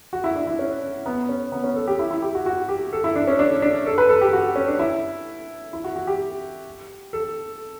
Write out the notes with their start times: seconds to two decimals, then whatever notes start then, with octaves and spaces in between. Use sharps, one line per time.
0.13 F#4
0.24 E4
0.36 D4
0.47 E4
0.59 C#4
1.06 B3
1.29 C#4
1.52 B3
1.64 C#4
1.76 A4
1.87 G4
1.99 E4
2.11 E4
2.22 G4
2.35 F#4
2.46 F#4
2.69 G4
2.93 A4
3.04 E4
3.16 D4
3.27 C#4
3.39 D4
3.62 D4
3.86 A4
3.98 B4
4.09 A4
4.21 G4
4.33 F#4
4.56 C#4
4.68 D4
4.79 E4
5.73 E4
5.84 F#4
5.96 F#4
6.07 G4
7.13 A4